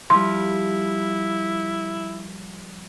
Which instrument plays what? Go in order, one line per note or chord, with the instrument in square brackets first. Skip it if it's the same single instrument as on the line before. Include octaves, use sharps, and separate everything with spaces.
[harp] F3 G3 [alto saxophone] E4 [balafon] C6